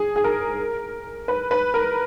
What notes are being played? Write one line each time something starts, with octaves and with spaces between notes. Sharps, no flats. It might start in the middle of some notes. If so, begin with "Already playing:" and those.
Already playing: G#4
G#4
A#4
B4
B4
A#4